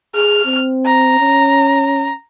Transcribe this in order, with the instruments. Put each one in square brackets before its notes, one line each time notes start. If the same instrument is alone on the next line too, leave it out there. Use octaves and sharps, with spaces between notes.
[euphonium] G#4 [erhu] F6
[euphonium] C4
[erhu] A#5
[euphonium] C#4